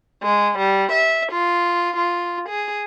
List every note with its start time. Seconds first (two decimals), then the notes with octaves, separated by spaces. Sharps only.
0.23 G#3
0.59 G3
0.93 E5
1.33 F4
1.98 F4
2.50 G#4